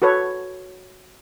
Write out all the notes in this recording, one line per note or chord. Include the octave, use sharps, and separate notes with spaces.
F#4 A4 B4 C#5